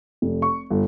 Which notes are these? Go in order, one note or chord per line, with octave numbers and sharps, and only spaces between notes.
F1
C#6
G1